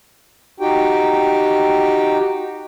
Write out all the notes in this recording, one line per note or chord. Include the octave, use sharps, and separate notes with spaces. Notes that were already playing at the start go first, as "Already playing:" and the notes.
D#4 F#4 G4 G5